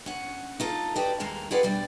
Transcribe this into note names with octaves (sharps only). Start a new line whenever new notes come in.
C#4 F#5
D#4 F4 A4
F#4 G4 B4 D5 D#5
D#2 G#3 A#3 F5
F4 G4 G#4 B4 D5 F#5
D2 B2 G3 D5